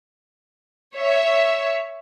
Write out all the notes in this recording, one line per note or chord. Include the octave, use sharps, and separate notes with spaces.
C#5 E5